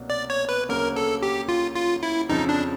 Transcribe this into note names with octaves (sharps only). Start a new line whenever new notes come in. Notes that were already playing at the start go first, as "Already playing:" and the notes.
Already playing: C2 B2 F#3 A#3 D4
D5
C#5
B4
D2 C#3 F#3 A#3 A#4
A4
G4
F4
F4
E4
F2 C#3 F3 D#4
D4